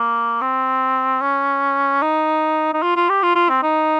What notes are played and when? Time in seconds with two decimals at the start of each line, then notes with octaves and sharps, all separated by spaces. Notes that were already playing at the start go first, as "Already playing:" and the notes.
Already playing: A#3
0.42 C4
1.21 C#4
2.02 D#4
2.74 D#4
2.82 F4
2.96 F4
3.09 G4
3.23 F4
3.36 F4
3.49 C4
3.63 D#4